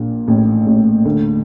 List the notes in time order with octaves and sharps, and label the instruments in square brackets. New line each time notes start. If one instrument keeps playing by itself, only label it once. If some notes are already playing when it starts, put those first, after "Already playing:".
Already playing: [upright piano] A#1 A#2
A1 A2
A1 A2
D2 D3